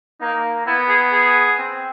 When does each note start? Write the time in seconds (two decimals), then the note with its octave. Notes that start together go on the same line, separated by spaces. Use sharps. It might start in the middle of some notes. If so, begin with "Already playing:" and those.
0.21 A#3 D#4
0.66 B3 E4
0.89 G#4
1.13 G#4
1.59 C4